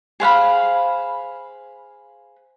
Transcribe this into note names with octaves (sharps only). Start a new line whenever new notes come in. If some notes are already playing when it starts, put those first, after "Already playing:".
G#4 C5 F5 B5